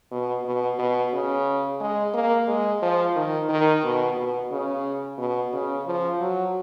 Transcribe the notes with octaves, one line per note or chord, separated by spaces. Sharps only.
B2
B2
B2
C#3
G#3
A#3
G#3
F3
D#3
D#3
B2
B2
C#3
B2
C#3
F3
F#3